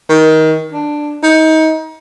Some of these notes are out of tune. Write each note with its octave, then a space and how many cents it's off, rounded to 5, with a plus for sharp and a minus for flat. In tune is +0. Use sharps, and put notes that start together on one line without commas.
D#3 +20
D4 +10
D#4 +30